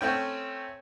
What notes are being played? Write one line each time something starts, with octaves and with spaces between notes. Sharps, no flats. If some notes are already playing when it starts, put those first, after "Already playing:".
A3 C4 C#4 G5